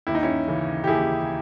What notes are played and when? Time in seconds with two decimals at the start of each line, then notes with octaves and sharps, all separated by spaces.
0.07 D#2 E4
0.15 D#4
0.23 C#4 E4
0.48 C#3 E3
0.84 G4
0.87 D#2 E4 G#4